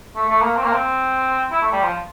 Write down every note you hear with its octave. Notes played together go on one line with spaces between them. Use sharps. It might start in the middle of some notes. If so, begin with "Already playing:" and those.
A3
A3
A#3
C4
A#3
C4
E4
A3
G3
F3